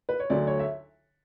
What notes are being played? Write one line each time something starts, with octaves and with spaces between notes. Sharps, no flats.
B4
C#5
D2 D3 F#3 D5
C#5
E5